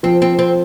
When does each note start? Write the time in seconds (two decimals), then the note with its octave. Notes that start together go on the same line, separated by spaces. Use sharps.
0.03 F3 C4
0.22 C4
0.39 C4